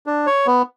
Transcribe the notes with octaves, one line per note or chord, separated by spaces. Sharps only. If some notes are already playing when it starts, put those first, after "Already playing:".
D4
C#5
B3